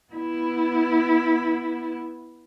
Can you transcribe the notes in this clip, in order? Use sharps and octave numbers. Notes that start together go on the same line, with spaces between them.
B3 E4